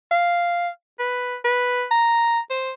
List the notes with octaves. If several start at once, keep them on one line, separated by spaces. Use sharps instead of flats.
F5
B4
B4
A#5
C5